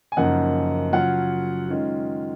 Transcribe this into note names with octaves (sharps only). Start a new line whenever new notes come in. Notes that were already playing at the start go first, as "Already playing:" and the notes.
G#5
F#2 C#3 F3 A#3 D#4 F#5
C#3 F#3 C#4 F4 F#5
D#3 G#3 C#4 F4